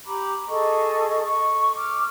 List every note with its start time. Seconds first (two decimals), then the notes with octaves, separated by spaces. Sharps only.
0.05 G4 A#5 B5 D6
0.48 G#4 A4 D#5 C#6
1.22 C#6
1.76 D6 F6